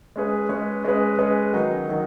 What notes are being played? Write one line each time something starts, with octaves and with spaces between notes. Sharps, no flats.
G#3 C#4 G#4 B4
G#3 C#4 G#4 B4
G#3 C#4 G#4 B4
G#3 C#4 G#4 B4
D#3 F#3 D#4
D#3 F#3 D#4